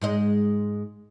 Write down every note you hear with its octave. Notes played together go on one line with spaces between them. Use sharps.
G#2 G#3 D#5